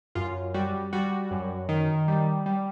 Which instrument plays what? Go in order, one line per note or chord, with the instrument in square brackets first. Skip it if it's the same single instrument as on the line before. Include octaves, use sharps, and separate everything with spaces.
[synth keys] F#2 F4
G3 F#4
G3 F#4
F#2
D#3
G3
G3